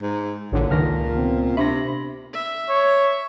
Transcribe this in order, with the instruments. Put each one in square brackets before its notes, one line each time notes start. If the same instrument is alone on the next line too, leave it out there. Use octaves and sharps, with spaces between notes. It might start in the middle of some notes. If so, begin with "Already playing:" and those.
[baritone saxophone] G#2
[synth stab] A1 D3 [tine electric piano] G2 G#4 C#5 [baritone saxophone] A#2
[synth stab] C#2 D#3 [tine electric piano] A5 F6 A#6
[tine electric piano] C3 B3 C4
[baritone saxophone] C3 [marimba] D4 E5 [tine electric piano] B5 C6 A#6
[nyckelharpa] E5
[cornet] C#5